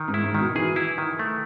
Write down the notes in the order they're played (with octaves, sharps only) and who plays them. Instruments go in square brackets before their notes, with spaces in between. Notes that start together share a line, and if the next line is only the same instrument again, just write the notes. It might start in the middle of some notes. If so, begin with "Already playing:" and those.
Already playing: [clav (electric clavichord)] D#3
[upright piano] G#2
[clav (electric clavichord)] E4
[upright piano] G#2
[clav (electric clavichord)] D#3
[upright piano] B2
[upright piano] E3 [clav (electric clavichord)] G#4
[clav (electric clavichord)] E4
D#3
A3